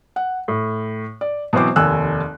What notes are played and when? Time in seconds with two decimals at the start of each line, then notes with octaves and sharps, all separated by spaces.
0.16 F#5
0.48 A2
1.21 D5
1.53 B2 E3 F#3 C4 C5 D6
1.76 F1 D#2 G#5 E6 F#6